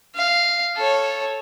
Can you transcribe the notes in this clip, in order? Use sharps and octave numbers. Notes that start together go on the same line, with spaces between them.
F5
A4 C#5